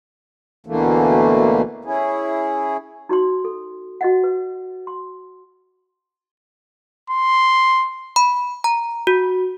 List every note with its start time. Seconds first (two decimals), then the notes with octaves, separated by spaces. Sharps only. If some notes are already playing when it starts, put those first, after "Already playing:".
0.66 D2 B2 D3 E3 A3 A#3
1.85 C#4 E4 G#4
3.09 D#4 F#4 D5 C6
3.45 A4
4.01 F#4 D#5 F#5
4.24 B4
4.87 C6
7.10 C6
8.16 B5
8.64 A#5
9.07 F#4